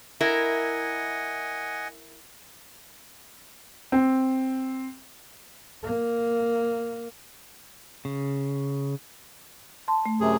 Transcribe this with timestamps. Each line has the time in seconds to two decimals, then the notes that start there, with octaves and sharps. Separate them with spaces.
0.21 E4 A#4 D#5 F#5 G#5
3.92 C4
5.83 A#3
8.05 C#3
9.88 A5 C6
10.06 A3
10.20 F#2 C3 G#4